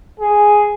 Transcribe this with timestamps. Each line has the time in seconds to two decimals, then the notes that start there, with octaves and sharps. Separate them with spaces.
0.20 G#4